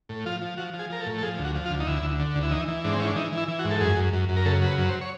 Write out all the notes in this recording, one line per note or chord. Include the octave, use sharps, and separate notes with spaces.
A2
F3 F4
F3
F3 F#4
F3
G#4
F3 A#4
A4
A2
A4
F3 G#4
D2
F#4
F3
F4
D2
D#4
D2 E4
D2
D3
D2
E4
E3 D#4
E3
G#2 D4
C4
E3 C#4
D4
E3 D#4
E3
E4
E3
F#4
G#2
A4
F#2 G#4
F#2
F#2
F#2
A#4
C#3 A4
F#3
B4
F#2
C5
C#5